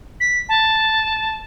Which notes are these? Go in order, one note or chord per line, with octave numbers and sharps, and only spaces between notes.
B6
A5